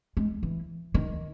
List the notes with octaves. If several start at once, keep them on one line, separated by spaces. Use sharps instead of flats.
G#3
E3
D#3